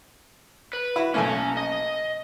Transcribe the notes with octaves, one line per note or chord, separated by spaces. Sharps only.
B4
E4 F#4
B1 A3 A#3 C#4 G#5
D#5